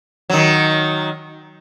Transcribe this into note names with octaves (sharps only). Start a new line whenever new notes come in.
D#3 F#3